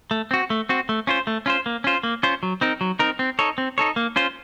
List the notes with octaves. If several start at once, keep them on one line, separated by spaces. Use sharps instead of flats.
A3
C4 F#4
A3
C4 F#4
A3
C#4 F4 C5
A3
C#4 F4 C5
A#3
C#4 F4 C5
A#3
C#4 F4 C5
F#3
C4 D#4 A#4
F#3
C4 D#4 A#4
C4
D#4 A4 C#5
C4
D#4 A4 C#5
A#3
C#4 F4 C5